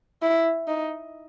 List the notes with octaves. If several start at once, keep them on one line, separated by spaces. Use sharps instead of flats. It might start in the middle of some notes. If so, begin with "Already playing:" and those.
E4
D#4